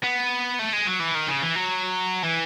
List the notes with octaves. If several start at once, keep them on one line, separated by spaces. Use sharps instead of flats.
B3
A3
G#3
F#3
E3
D#3
C#3
E3
F#3
E3